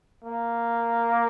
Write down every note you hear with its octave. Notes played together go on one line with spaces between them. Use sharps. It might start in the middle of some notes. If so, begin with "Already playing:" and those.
A#3